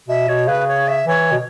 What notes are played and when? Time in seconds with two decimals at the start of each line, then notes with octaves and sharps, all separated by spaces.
0.08 B2 E5
0.28 B2 C#5
0.48 C#3 B4
0.68 C#5
0.88 E5
1.07 E3 C#5
1.32 B2